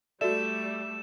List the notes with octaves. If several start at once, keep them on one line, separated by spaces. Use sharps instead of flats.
G3 A3 F#4 A4 D5 E5 E7